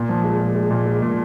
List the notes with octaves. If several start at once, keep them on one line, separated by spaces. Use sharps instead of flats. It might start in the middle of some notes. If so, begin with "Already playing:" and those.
Already playing: A#2
F3
G#3
G#3
G#3
A#2
G#3
A#2